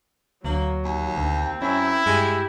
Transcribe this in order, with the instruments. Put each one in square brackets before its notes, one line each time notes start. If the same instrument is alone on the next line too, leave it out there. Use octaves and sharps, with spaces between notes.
[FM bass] D2 [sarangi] F#3 [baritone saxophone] A#3
[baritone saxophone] D#2
[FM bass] D2 [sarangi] C4
[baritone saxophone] F#2 [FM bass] C#4 [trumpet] E4
[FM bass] G2 [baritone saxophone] G#3 [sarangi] G4